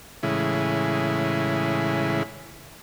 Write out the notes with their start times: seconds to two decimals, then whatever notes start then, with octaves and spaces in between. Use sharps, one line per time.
0.23 A2 C#3 E3 G#3 E4